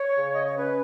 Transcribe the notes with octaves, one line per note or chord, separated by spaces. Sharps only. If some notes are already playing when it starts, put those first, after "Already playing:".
Already playing: C#5
C#3
D#5
C#5
C#4 B4